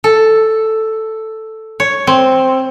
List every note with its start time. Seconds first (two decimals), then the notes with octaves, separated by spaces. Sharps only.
0.04 A4
1.80 C#5
2.07 C4